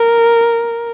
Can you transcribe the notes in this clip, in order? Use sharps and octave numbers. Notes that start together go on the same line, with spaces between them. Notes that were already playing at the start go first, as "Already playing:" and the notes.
Already playing: A#4